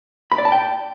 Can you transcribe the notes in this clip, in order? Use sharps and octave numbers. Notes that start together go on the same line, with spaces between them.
B5
D5
A5
G5